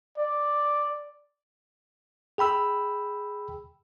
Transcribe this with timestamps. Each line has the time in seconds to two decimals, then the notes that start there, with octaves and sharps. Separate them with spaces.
0.18 D5
2.38 G#4 G5 B5 E6